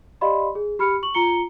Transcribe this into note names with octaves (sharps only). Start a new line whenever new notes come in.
G4 D5 D#5 F5 B5 C6
G#4
G4 B5 F6 C#7
C#6 F#7
F4 A#5 C#7 G7